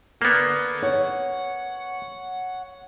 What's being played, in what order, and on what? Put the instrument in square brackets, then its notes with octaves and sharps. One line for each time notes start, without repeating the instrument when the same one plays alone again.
[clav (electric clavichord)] A#3 B3 [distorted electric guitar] A4 D5
[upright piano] C#5 [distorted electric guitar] F#5